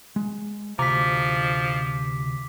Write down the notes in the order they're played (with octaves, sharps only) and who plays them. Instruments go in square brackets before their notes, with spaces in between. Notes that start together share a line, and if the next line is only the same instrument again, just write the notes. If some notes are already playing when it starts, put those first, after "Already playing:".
[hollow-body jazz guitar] G#3
[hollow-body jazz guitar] D2 A#5 [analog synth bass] C3 [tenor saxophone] F3 [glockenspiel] D6 B6